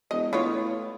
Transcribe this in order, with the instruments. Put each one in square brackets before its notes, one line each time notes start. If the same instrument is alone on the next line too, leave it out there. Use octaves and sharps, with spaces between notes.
[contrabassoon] E1 [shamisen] D#5
[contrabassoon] A2 [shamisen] B3 F4 C#5